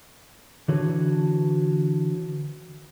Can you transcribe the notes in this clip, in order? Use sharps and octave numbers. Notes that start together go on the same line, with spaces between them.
D3 E3 D4 F#4 B4 C#5